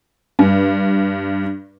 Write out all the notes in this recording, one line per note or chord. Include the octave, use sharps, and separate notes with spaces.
G2